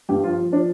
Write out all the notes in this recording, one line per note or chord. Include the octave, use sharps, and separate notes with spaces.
G2 G4
F3 F4
F3
F3 D4